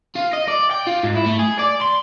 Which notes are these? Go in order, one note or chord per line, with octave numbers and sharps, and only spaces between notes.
F4
D#5
D5
G5
F4
G#2
E4
A3
G#4
D5
C6